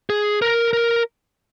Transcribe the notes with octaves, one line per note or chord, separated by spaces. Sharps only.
G#4
A#4
A#4